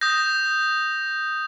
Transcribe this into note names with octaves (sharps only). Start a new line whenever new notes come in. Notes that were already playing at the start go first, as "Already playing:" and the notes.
D#6 G6 A#6